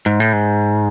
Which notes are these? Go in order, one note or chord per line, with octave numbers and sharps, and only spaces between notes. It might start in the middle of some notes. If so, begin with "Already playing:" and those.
G#2
A2
G#2